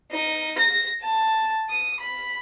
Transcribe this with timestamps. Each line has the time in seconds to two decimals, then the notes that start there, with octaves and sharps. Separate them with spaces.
0.11 D#4
0.58 A#6
1.02 A5
1.69 D#6
2.00 B5